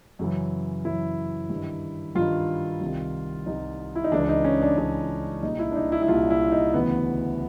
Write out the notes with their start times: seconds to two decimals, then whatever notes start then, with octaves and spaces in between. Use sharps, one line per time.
0.19 F#2 C#3 E3
0.85 F#2 C#3 E3 E4
1.50 G2
1.55 D#3
2.15 G2 D#3 F4
2.81 C2 C3 D#3
3.46 C2 C3 D#3 D#4
3.95 E4
4.04 D#4
4.12 C#2 C#3 E3 D4
4.29 D#4
4.44 C#4
4.62 D4
4.77 C#2 C#3 E3 D4
5.43 C2 A#2 D#4
5.59 E4
5.71 D4
5.76 D#4
5.92 E4
6.02 E4
6.08 C2 A#2 F4
6.30 E4
6.52 D#4
6.74 D2 C#3 E3 B3